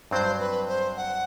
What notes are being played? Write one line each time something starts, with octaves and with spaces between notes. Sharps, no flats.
G2 F#3 C4 C5
B4
C5
F#5